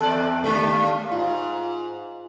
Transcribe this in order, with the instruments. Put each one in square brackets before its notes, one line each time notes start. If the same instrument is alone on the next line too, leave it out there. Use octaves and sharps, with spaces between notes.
[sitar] E2 D5 [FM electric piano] A4 F#6
[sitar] D#2 G#3 D4 [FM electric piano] A3
[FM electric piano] F5
[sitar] G#2 [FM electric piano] F4